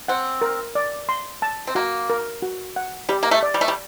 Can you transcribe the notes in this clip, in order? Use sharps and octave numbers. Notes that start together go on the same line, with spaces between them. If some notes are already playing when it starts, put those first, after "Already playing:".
C4 F#5
A#4
D5
C6
A5
C4
A#3 F#4
A#4
F#4
F#5
G3 G4
A#3
A3
D5
G3
A3
G3